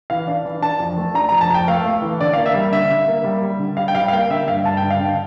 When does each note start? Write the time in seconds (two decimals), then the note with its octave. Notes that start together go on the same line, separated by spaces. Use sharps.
0.10 E3 F5
0.27 D4
0.45 E3
0.62 D4 A5
0.80 F2
0.98 A3
1.14 D4 A#5
1.29 A#5
1.32 F2
1.41 A5
1.50 F2 G5
1.68 A3 F5
1.85 A3
2.02 E3
2.21 D3 D5
2.33 F5
2.38 A#3
2.46 E5
2.54 G3
2.72 D3 E5
2.91 D3
3.08 A#3
3.24 G3
3.42 G3
3.59 D3
3.77 G3 F5
3.88 G5
3.95 G3 F5
4.08 F5
4.13 A#3 G5
4.30 D3 E5
4.48 G2 F5
4.64 G2 A5
4.77 G5
4.82 D3
4.91 F5
4.99 D3 G5